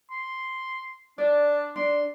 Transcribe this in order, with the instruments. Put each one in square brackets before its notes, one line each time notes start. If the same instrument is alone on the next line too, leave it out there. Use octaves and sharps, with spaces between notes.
[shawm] C6
[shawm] D4 [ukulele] D5
[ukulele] D4 [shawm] C6